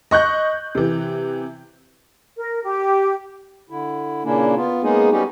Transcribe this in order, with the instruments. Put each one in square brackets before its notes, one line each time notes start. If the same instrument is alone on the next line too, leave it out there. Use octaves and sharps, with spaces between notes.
[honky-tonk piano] D#5 C#6 F#6 G6
C3 E3
[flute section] A#4
G4
[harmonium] D3 E4
A#2 C#3 A#3 C#4 D4 E4
B3 F4
G#3 A#3 B3 C#4 D#4 G#4
G3 B3 C#4 D#4 F#4 G4